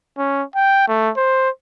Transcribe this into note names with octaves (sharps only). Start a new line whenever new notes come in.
C#4
G5
A3
C5